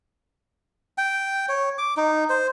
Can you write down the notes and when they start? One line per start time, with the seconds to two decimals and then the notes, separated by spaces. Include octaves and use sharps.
0.98 G5
1.49 C#5
1.78 D6
1.97 D#4
2.30 C5